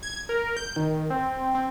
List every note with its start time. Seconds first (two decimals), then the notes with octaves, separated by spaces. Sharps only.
0.03 G#6
0.29 A#4
0.57 G6
0.76 D#3
1.10 C4
1.55 C4